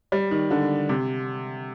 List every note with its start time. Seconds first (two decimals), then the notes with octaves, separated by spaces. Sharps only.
0.12 G3
0.31 D#3
0.50 D3
0.89 C3